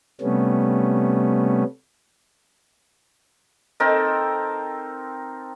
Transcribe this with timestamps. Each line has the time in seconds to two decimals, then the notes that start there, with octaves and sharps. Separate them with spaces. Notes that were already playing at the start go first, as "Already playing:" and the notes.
0.21 C3 G3 A3 B3 C#4
3.80 C4 D#4 A4 A#4